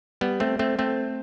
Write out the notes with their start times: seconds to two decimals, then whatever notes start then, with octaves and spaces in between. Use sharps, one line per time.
0.21 G3 B3
0.40 A3 C4
0.59 A3 C4
0.79 A3 C4